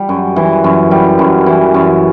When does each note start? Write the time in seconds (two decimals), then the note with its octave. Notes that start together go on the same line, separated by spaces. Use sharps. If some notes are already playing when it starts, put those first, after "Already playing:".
Already playing: G3
0.09 F#2
0.36 E3
0.64 F#2
0.91 G3
1.19 F#2
1.46 E3
1.74 F#2